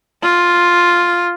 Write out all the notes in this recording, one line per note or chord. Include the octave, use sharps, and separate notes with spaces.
F4